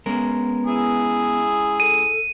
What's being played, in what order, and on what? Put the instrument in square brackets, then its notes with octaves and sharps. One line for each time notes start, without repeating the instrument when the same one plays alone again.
[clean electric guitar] G#3 C#4 A#4 [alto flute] B3
[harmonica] E4 G#4
[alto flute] A4 [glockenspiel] D#7